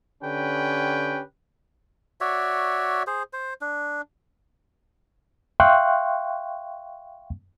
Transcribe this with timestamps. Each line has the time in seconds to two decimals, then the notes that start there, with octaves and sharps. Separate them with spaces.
0.23 D3 C#4 G4 B4 G5
2.21 F#4 C#5 D5 E5
3.07 G#4 C5
3.33 C5
3.61 D4
5.60 E5 F5 G5 C6 C#6 F#6